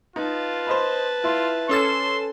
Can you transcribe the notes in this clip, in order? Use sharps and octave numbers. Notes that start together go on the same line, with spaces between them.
D#4 F4 B4 A5
C5 D#5 B5
E4 F4 C6
C#4 A4 C6 D6 E6 A6 E7